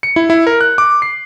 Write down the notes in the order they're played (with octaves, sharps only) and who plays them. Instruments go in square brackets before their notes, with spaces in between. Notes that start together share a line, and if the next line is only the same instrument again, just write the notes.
[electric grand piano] C#7
E4
E4
A#4
F#6
D6
C7